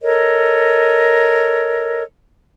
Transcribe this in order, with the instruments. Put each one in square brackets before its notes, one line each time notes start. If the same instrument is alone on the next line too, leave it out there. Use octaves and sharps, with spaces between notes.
[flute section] A4 A#4 C#5 D#5